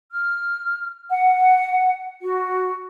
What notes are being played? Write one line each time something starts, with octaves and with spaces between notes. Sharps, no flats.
F6
F#5
F#4